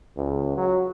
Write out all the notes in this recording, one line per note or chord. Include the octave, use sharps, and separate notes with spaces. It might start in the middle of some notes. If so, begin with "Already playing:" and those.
C#2
F#3